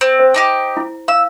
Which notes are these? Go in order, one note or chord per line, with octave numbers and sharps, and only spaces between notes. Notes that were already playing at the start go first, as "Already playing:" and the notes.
C4
C5
D4 D#4 G4
E4
F5 E6